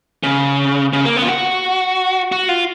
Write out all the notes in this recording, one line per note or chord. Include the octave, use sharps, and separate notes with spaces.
C#3
C#3
A#3
B3
F4
F#4
F#4
F4